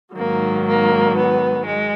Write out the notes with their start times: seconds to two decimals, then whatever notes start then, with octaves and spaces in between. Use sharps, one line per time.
0.15 G#2 D#3 F#3 A#3
0.65 A#3
1.15 B3
1.65 G#3